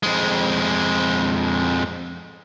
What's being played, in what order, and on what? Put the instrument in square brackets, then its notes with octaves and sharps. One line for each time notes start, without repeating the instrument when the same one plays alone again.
[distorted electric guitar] F2 G#3